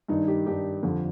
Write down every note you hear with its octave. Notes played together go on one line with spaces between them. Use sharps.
G2 D#3 D#4
G4
G2 D#3 G4
F2 D3 F3